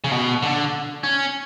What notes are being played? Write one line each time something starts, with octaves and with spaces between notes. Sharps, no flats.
C#3
B2
D3
C#4